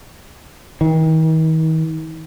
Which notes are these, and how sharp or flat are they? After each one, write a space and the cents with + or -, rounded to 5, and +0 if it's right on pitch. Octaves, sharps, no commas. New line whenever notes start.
D#3 +40